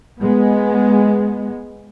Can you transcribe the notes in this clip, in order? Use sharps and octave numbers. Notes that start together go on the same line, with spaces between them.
G#3 B3